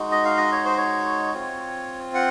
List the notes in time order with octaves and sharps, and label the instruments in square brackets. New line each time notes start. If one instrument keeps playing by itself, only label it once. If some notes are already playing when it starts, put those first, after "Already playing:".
Already playing: [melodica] G#3 D#4 F#4
D#5
F5
D#5
C#5
C5
C#5
C4 F4
F#5